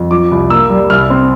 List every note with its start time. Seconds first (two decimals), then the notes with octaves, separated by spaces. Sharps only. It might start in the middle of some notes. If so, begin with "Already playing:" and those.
Already playing: F2
0.11 F3 D6
0.31 C2
0.50 A#3 E6
0.70 G3
0.90 C2 F6
1.10 C4